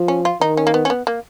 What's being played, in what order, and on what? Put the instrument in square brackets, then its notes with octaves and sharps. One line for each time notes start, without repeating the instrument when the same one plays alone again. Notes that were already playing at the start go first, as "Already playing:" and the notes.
Already playing: [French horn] F3
[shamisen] C#4
F4
[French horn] D#3 [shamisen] D#4
[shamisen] C#4
A#3
B3
C#4
B3
A#3